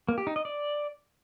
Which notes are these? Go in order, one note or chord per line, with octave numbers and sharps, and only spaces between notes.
A#3
G4
D#4
D#5
D5